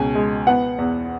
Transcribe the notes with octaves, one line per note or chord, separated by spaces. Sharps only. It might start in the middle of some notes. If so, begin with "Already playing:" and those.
Already playing: C#2 B2 G#5
G#3
B3 F#5
E2